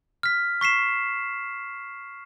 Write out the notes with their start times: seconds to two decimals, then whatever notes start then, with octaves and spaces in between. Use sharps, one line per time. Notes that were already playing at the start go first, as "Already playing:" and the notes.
0.23 F6 B6
0.61 C#6 B6 C7 E7